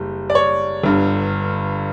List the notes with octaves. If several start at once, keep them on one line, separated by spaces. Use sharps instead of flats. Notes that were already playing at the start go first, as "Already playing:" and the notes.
Already playing: F#1 G3
D5
C#5
G1 G2 D3